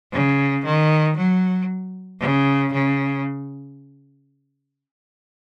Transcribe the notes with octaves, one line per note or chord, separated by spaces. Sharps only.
C#3
D#3
F#3
C#3
C#3